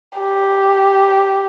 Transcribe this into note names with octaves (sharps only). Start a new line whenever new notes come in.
G4